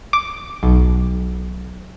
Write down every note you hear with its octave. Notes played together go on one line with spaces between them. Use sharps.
D6
B1